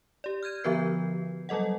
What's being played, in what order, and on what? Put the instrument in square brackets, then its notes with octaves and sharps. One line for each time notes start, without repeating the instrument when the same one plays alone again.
[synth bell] G4 D5
F6 G6 G#6 D#7
D3 F3 B3 F#4 B4 C7
F#3 G3 A4 D#5 F#5